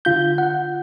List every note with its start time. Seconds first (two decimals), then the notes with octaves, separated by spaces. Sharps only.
0.05 D3 F4 G6
0.38 F#5